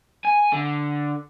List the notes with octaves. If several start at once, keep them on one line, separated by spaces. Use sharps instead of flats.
G#5
D3